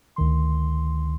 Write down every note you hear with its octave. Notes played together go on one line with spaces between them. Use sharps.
D2 D#3 C6